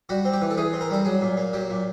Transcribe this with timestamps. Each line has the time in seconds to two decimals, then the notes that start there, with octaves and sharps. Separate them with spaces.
0.09 G3 F#4
0.25 C4
0.33 G4
0.41 E3
0.50 A4
0.57 E3 G#4
0.73 C4
0.81 A#4
0.90 G3 A4
1.05 F#3 G#4
1.21 A#2
1.37 A#3
1.53 F#3 G4
1.70 A#2